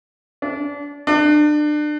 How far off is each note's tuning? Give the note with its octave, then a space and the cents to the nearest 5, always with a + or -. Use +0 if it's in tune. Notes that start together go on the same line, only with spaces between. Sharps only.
D4 -35
D4 +30